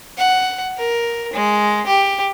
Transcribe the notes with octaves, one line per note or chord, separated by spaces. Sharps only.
F#5
A#4
G#3
G4